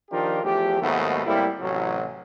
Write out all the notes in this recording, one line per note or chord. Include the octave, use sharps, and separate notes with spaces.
D#3 F3 D4 F4 G4 A#4
E2 F3 A3 G4
D#2 G#2 D#3 F#3 A3 B3
A2 G3 A#3 C4 E4
A1 C3 F#3